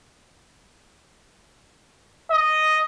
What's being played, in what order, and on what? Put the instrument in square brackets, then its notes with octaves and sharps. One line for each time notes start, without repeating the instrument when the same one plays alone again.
[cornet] D#5